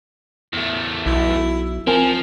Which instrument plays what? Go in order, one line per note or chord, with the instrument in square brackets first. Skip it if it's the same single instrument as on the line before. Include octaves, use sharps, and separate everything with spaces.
[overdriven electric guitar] E2 A3
[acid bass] B1 [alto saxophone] E4
[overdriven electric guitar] F3 [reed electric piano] C4 G#5 [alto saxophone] A#4